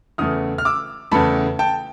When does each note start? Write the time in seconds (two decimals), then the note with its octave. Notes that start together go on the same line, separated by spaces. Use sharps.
0.18 E2 C#3 E3 A3 D#6 F6
0.58 F6
0.65 D6 E6
1.11 E2 C#3 E3 A3 A5 B5
1.59 G5 A5